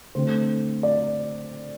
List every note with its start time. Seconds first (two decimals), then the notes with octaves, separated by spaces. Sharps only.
0.15 D3 A3 C4 C5
0.83 D5